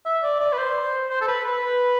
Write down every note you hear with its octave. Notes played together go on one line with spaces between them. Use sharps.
E5
D5
D5
B4
C5
C5
A4
B4
B4